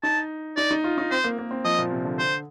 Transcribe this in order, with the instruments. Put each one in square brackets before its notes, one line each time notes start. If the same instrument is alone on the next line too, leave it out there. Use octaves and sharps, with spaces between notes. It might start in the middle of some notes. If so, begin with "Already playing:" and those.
[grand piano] D#4 [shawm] A5
[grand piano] D#4 [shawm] D5
[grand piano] D#4
F4
D#4
[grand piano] C4 [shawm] C5
[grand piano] A#3
A#3
C4
[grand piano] F3 [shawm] D#5
[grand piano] A#2
C3
D3
[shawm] C5